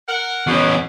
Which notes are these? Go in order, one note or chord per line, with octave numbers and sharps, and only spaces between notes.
A#4 F#5
E2 B2 C#4